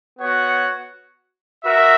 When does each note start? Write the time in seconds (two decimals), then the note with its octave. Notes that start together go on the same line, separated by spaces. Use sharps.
0.19 B3 F#4 C#5 F#5
1.65 F#4 A#4 E5